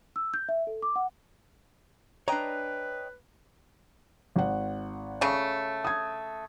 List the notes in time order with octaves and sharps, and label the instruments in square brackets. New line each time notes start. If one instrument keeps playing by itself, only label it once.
[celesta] E6
G6
E5
A4
D6
F#5
[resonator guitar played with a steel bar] D4 A#5 [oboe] B4 [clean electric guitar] C#5 D#5 G5
[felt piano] G#1 F#5
[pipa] C#3 A3
[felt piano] D#6 G#6